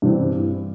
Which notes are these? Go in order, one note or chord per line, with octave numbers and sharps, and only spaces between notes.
G2 E3 C4